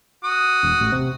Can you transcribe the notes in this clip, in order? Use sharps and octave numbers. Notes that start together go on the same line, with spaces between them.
F#4 D#6
E1
A1
C3